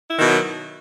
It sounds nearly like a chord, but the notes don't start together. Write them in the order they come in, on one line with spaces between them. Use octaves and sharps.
E4 D#3 B2 F#3